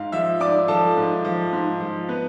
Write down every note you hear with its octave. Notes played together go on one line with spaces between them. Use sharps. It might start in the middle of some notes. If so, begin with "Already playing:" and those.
Already playing: G#2 F5
F3 E5 E6
G#2 D5 D6
F3 A4 A5
G#2
F3
G#2
F3
B3 B4